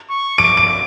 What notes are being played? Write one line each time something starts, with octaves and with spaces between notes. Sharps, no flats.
C#6
D6 D7
D7